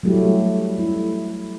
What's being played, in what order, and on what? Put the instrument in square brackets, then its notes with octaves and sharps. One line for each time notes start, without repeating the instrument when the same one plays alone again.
[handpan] F#3 G3 A3 E4 G4
A3 E4